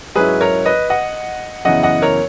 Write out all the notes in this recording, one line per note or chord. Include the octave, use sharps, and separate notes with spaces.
G#2 F#3 C#4 E4 G#4 B4
A#4 C#5
B4 D#5
D#5 F#5
F#2 C#3 E3 B3 E4 D#5 F#5
D#5 F#5
A#4 C#5